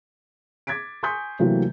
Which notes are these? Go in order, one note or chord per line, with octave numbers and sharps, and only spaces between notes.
D6 G#6 A6 B6 D7
G#5 C6 C#6 D#6 G6 B6
C3 E3 F#3 A3 A#3 G4